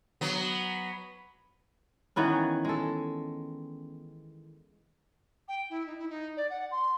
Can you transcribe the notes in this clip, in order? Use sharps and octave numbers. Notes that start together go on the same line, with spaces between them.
F#3 B3
D#3 E3 B3 C#4
G#3 A4
G5
E4
D#4
E4
D#4
D5
F#5
C6